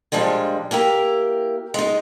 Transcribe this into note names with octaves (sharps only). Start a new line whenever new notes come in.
A#2 F3 G3 G#3 D4
A#3 E4 G4 A#4
G#3 D#4